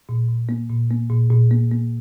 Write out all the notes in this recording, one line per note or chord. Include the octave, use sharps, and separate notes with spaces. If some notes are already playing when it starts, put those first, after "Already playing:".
A#2
A#2
A#3
A#2
A#3
A#2
A#2
A#3
A#3